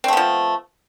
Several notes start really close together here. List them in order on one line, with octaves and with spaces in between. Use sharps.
C4 A3 B3 F3